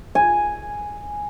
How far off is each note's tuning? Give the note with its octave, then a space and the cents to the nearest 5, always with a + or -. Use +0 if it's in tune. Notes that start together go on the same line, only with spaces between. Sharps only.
G#5 +0